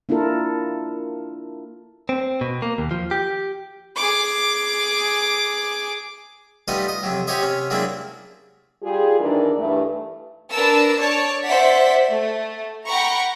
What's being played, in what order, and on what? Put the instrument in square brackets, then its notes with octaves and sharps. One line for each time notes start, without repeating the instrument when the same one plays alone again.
[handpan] A#3 D4 E4 F4 A4 A#4
[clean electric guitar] C4
B2
A#3
D#2
F3
G4
[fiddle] G#4 D6
[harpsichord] G3 A3 B3 D#4 F4 D#5
D#5
F2 C3 F#3
F#4 G4 C5 C#5 D#5 E5
C3 C#4
F#3 G#3 A#3 C4 D4 E4
[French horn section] G3 F4 G4 G#4
D#2 E3 D4 D#4 A#4 D5
G2 E3 A3
[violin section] D4 A#4 B4 A5 E6
C#5 D5 A5
C5 D5 E5 F#5 B6
A3
F#5 G5 A#5 B5 C#6